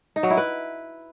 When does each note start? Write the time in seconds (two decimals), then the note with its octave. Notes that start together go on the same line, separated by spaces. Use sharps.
0.16 D#4
0.23 F#3
0.30 E4
0.37 B4